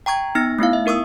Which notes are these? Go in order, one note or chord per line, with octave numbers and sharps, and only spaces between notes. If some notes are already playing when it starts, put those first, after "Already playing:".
G5 A#5 C#6 G#6
B3 D#4 F6 A#6
A3 B3 E4 F5
E5
D#4 A#4 C#6 D#6 E6